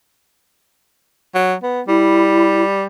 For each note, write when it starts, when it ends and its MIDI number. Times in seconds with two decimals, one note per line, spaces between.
1.34 1.54 54
1.63 1.81 59
1.88 2.85 55
1.88 2.63 64